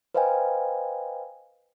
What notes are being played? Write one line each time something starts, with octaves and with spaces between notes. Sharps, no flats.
B4 C5 D#5 F5 G5 G#5